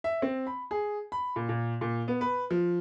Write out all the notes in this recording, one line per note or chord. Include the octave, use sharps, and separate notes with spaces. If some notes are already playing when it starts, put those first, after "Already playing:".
E5
C4
B5
G#4
B5
A#2
A#2
A#2
B3
B4
F3